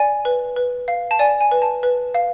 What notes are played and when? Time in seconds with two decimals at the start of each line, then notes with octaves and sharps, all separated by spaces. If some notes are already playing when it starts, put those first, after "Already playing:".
Already playing: D5 G#5
0.25 B4
0.56 B4
0.88 F5
1.11 A5
1.19 D5 G#5
1.41 G#5
1.51 B4
1.62 A5
1.83 B4
2.14 F5